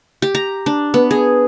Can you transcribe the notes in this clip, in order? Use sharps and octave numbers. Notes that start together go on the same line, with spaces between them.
G4
A#5
D4
B3
G#4